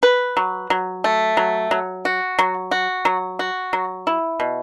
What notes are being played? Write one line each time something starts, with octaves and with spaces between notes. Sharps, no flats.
B4
F#3
F#3
A3
F#3
F#3
F#4
F#3
F#4
F#3
F#4
F#3
E4
B2